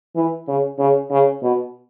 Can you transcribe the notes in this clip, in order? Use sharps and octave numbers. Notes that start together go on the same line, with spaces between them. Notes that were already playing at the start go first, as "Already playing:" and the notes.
E3
C#3
C#3
C#3
B2